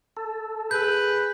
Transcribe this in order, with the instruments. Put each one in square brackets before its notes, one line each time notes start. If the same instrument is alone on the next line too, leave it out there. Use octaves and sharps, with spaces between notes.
[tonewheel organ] A4
[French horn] G#4 [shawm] B4 [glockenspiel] G6